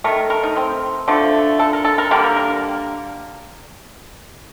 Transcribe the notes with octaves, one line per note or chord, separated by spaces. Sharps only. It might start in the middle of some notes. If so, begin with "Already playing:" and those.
D#3 A3 A#4
A#4
D#4
C4
D3 F3 A3
A4
A#4
A4
A#4
D3 G3 A#3 A#4
A#4
A#4